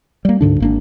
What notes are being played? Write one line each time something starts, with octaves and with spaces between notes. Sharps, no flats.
G3 A#3
D2 G#2 D3 D4
G#1 A#3 D4